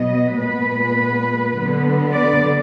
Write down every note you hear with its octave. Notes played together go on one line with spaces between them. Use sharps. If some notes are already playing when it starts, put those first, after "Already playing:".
Already playing: B2 F#3 B3 D#5
A#2 G#3 B3 B4
D3 F#3 B3
D5